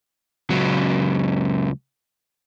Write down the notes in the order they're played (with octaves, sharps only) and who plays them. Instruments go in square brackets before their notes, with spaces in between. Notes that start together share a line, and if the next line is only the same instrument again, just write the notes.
[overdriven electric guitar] C#2 F#3